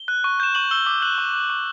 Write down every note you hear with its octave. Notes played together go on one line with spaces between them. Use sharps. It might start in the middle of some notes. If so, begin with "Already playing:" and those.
Already playing: G7
F#6
C#6
G6 E7
C#6 F#7
E6 G6 G7
D6 F#7
F#6 F#7
C#6
F#6
C#6